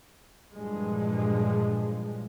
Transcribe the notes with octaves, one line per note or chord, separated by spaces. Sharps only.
G2 A#2 E3 F3 G#3